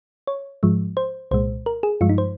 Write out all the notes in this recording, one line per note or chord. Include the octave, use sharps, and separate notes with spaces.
C#5
G#2 F3 G#3
C5
C2 A#2 G#3 C5
A#4
G#4
G2 F3 G#3 F4
D#4
C5